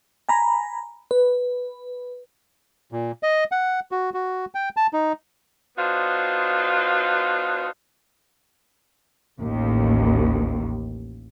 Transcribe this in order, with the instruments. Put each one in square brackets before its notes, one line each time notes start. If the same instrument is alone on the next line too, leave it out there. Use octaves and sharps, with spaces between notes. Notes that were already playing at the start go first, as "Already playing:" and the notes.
[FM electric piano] G#5 A#5 B5
B4
[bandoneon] A#2
D#5
F#5
F#4
F#4
G5
A5
D#4
[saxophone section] B3 D4 D#4 F4 F#4 C5
[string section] A1 D#2